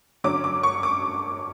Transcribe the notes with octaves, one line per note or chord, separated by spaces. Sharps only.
D3 F#3 C#4 D6
D6
C#6
D6